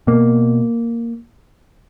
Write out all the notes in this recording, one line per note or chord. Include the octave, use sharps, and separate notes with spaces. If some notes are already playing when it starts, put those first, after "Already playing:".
B2 A#3